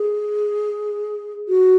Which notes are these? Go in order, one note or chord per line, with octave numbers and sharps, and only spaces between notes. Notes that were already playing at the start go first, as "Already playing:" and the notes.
Already playing: G#4
F#4